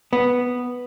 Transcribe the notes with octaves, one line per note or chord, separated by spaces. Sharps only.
B3